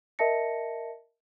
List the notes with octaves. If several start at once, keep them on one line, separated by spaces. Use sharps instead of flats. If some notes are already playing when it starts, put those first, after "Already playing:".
A#4 D#5 E5 A5 A#6 C#7